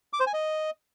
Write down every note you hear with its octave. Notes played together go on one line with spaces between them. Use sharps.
D6
C5
G#5
D#5